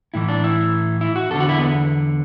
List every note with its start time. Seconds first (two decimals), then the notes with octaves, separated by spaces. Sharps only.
0.14 A2 E3 E4
0.29 D4
0.44 E4
1.01 E4
1.16 F#4
1.30 E2 A4
1.34 D3
1.40 F#4
1.49 E4
1.58 B3